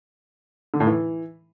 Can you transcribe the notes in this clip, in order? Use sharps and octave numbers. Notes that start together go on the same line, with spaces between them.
D3
A2
E3